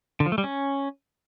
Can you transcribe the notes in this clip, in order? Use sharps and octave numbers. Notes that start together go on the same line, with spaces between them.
D3
F3
A3
G3
C#4